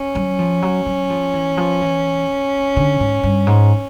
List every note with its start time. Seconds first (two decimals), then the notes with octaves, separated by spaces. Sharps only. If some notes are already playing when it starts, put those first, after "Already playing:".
Already playing: C#4
0.15 F#3
0.39 F3
0.62 F#3
0.86 F#3
1.10 F3
1.34 E3
1.57 F3
1.82 E3
2.77 D3
3.00 G#2
3.23 G2
3.47 G#2